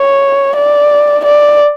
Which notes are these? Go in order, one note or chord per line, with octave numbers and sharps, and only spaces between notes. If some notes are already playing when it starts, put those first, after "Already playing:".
Already playing: C#5
D5
D5